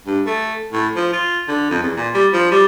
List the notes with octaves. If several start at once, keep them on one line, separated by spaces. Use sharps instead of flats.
G2
A3
A2
F3
F4
D3
F2
E2
A#2
G3
F3
G3